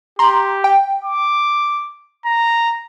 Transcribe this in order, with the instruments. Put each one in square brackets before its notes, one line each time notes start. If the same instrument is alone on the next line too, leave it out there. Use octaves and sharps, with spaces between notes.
[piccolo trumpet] G4 [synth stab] A#5 C6
[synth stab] G5
[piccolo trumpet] D6
A#5